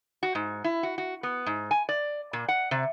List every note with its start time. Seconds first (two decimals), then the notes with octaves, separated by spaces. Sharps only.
0.23 F#4
0.35 G#2
0.64 E4
0.83 F#4
0.98 F#4
1.23 B3
1.46 G#2
1.71 G#5
1.89 D5
2.33 A#2
2.48 F#5
2.71 C3